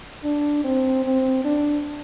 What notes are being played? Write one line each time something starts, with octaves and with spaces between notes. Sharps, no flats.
D4
C4
C4
D4